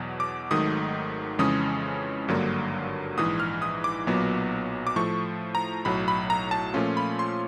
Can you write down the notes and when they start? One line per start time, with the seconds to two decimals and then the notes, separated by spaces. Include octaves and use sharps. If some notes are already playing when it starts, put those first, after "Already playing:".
Already playing: E2 B2 F#3
0.20 D6
0.51 G#1 G#2 D#3 F#3 A3 D#6
1.39 F2 C#3 E3 G#3 C#4 D#6
2.28 G#1 G2 D3 F#3 A#3
3.17 A#1 G#2 E3 D#6
3.40 F6
3.62 D#6
3.84 D6
4.07 B1 A#2 F#3 B3
4.87 D6
4.96 A2 F3 A3 C#6
5.55 A#5
5.85 B1 A2 F#3 B5
6.08 B5
6.30 A#5
6.51 A5
6.74 A#2 F3 A3 C#4 F4
6.97 B5
7.19 C6